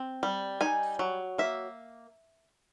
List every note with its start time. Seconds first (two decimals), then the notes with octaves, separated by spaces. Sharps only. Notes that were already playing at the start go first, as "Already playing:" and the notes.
Already playing: C4
0.23 G3
0.61 D#4 G#5
0.99 F#3
1.38 A#3 E5